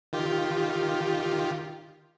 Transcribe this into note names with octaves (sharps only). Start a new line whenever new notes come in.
D#3 F4 G4